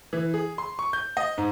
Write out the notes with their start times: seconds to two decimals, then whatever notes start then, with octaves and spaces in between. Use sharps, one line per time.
0.13 E3
0.34 G#4
0.58 C6
0.79 C#6
0.93 G6
1.17 D#5
1.38 G#2